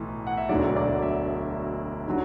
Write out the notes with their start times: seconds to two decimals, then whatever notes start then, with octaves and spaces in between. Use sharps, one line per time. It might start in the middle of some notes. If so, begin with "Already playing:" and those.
Already playing: B1 A2 E3
0.27 F#5
0.37 E5
0.49 E1 D2 D3 F#3 D5
0.76 D5
1.02 E5
2.08 D3 F#3